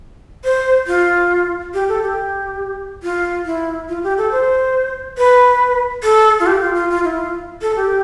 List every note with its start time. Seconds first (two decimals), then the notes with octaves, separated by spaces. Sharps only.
0.44 C5
0.87 F4
1.74 G4
1.89 A4
2.02 G4
3.03 F4
3.46 E4
3.89 F4
4.04 G4
4.18 A4
4.32 C5
5.18 B4
6.03 A4
6.40 F4
6.46 G4
6.61 F4
6.75 F4
6.90 F4
7.05 E4
7.18 F4
7.62 A4
7.76 G4